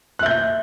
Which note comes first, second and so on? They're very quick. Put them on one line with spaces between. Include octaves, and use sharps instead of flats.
F#6 E5 G6